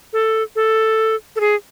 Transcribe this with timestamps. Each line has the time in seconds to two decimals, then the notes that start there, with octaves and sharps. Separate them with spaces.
0.13 A4
0.56 A4
1.36 A4
1.40 G#4